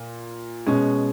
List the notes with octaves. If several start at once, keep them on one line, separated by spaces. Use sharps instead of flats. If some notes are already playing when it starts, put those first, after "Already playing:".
Already playing: A#2
B2 G#3 C#4